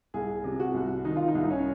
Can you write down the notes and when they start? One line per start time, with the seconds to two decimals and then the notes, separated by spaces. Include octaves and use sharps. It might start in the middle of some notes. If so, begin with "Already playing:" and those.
0.14 C2 G#4
0.44 C3
0.60 F#4
0.74 C2
1.05 D#3 D#4
1.16 F4
1.28 D#4
1.35 C2
1.44 D#4
1.50 C#4